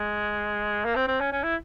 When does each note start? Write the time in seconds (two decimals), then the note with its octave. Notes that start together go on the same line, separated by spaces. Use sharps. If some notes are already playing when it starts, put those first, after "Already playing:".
Already playing: G#3
0.85 A#3
0.96 C4
1.08 C4
1.20 C#4
1.32 C#4
1.43 E4